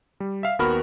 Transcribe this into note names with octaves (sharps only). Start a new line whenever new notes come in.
G3
E5 F5
D#2 B3 F#4 A#4 B5 F6